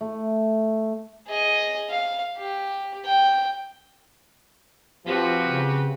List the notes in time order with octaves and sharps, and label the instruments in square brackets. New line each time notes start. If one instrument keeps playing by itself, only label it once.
[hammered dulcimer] A3
[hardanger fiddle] G#4 D#5
F5
G4
G5
[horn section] F3 [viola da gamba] C4 F#4 B4 [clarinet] G4
[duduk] C#3